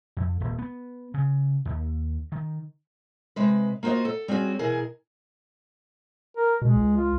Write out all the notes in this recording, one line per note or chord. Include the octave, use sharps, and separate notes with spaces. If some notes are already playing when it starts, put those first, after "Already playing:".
F2
D#1
B3
C#3
D#2
D#3
C3 G#3 B4
A#3 F4 F#4 C5 D#5
A4
G3 C4 C#4 F#4 G#4
B2 E3 G#4 A#4
A#4
B2 G#3
C#2
F4